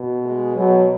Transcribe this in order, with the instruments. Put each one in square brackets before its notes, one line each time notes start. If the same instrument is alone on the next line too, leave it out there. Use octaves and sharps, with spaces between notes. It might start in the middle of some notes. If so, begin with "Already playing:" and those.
Already playing: [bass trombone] B2
[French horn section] G#3
[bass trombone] B2 [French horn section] F#3